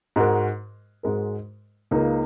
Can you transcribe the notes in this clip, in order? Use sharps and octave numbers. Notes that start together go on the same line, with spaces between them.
G#2 G#3 F#4 A#4
G#2 G#3 F#4 A#4
C#2 C#3 A#3 D#4